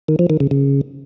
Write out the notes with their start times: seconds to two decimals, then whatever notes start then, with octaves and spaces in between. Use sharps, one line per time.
0.08 D#3
0.19 F3
0.30 D#3
0.40 C#3
0.51 C#3